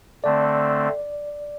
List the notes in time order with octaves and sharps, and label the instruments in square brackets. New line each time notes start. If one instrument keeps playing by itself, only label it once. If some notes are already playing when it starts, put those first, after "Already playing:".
[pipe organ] D3 A3 C4 [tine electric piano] D5